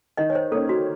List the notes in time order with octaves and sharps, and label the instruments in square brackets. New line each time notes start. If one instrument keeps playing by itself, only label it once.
[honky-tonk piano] D#3 [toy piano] D#5
[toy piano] C#5
C5
[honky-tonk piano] A#3 C#4 [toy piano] A4
[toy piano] F#4